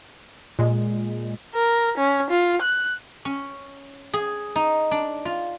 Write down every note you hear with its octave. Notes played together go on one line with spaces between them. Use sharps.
A#2 G#3
A#4
C#4
F4
F#6
C#4
G#4
D#4
D4
F4